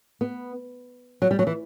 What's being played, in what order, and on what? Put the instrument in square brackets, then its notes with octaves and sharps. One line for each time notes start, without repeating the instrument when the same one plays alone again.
[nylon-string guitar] B3
F#3
G3
F#3
E3